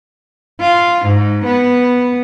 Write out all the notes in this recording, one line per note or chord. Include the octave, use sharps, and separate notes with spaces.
F4
G#2
B3